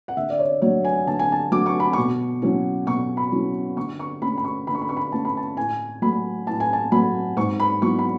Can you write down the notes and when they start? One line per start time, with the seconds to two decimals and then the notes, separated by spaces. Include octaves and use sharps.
0.08 F#5
0.17 D3 E5
0.30 D5
0.39 C#5
0.62 F#3 A3 D4 C#5
0.85 G#5
1.07 D3 A5
1.19 G#5
1.32 A5
1.52 F#3 A3 D4 D6
1.66 C#6
1.80 B5
1.93 B2 C#6
2.42 F#3 C#4 E4
2.87 B2 C#6
3.17 B5
3.32 F#3 C#4 E4
3.77 D3 C#6
3.99 C#6
4.22 A3 C#4 B5
4.37 B5
4.44 C#6
4.67 D3 B5
4.75 C#6
4.81 B5
4.89 C#6
4.97 B5
5.12 A3 C#4 A5
5.25 B5
5.37 A5
5.57 A2 G#5
6.02 F#3 A3 B5
6.47 A2 A5
6.60 G#5
6.73 A5
6.92 F#3 A3 B5
7.37 G#2 C#6
7.60 B5
7.82 F#3 B3 E4 C#6
7.99 B5